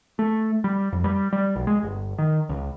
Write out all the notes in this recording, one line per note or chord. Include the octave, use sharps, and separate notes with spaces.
A3
G3
F2
G3
G3
B1
G#3
G1
D#3
C#2